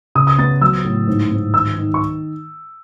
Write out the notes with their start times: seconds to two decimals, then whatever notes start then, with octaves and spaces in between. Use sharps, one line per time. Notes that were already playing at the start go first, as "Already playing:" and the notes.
0.15 C#3 D#6
0.27 D#6
0.38 B3 A6
0.61 F#3 E6
0.84 A2
1.08 G#2
1.31 G#2
1.54 D#3 E6
1.77 D#3
1.94 C#6